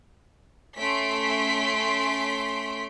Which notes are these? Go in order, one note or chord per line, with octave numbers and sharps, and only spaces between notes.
A3 C#4 C6 B6 D7